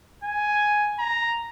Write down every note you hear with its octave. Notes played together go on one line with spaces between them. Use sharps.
G#5
A#5